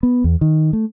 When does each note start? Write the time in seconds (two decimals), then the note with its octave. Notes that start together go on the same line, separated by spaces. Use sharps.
0.03 B3
0.24 E2
0.41 D#3
0.73 A3